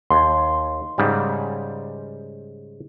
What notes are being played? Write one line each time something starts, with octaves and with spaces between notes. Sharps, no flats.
D#2 C6
G#2 C#3 G3